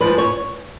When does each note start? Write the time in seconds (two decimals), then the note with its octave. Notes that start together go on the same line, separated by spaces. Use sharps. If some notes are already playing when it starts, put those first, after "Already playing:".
0.01 G#2 F3 B4
0.18 C#5